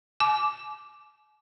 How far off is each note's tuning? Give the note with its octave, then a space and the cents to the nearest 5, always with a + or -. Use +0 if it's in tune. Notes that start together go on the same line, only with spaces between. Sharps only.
G#5 +45 D6 +0